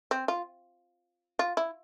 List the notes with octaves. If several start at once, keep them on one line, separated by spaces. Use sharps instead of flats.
C4
F4
F4
E4